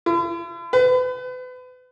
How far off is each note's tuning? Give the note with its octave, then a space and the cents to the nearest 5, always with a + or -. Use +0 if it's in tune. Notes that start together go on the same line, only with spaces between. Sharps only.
E4 +45
B4 +35